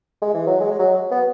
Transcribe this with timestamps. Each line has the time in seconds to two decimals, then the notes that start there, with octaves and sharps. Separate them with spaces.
0.22 G#3
0.34 E3
0.47 F#3
0.60 G#3
0.72 G#3
0.79 F#3
1.11 B3